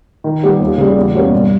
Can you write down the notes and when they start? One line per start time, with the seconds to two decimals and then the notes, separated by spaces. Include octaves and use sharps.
0.24 D#3
0.43 G3 B3 G4
0.61 D#2
0.78 C#3 G3
0.96 E2
1.14 B2 G3 A#3 C#4
1.32 G2